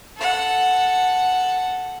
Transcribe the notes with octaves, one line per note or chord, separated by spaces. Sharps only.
A4 F#5